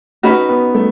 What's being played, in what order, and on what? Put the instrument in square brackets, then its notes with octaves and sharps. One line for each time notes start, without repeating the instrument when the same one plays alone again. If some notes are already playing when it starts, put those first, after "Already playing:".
[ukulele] C#4 F#4 B4 [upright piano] D#4
[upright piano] B3
A3